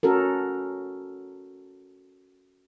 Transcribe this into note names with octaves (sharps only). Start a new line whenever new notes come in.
C#4 F#4 A4 A#4